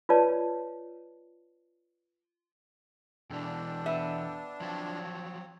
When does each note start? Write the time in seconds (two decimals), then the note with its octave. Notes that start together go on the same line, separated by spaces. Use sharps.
0.09 F4 B4 C#5 D5 A5
3.30 E2 B2 E3 D4 A4 G5
3.86 B3 E5
4.61 F3 F#3 C4 C#5 A5